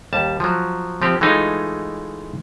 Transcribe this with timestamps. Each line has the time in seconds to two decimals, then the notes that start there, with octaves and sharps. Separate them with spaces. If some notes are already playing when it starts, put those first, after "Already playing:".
0.13 D#2 G3 A5
0.40 F3 F#3
1.02 F3 C4 G4
1.21 E3 G#3 A3 D#4 F4 C#5